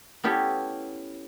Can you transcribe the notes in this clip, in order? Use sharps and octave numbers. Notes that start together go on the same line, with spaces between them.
B3 C#4 E4 G4 A4